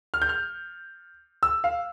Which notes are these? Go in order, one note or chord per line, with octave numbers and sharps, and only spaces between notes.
F6
G6
F6
E6
F5